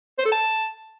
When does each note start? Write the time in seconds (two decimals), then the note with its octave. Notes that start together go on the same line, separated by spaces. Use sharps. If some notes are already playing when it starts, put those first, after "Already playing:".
0.19 C5
0.25 A4
0.32 A5